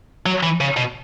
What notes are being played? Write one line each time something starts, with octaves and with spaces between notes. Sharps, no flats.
F#3
E3
C#3
B2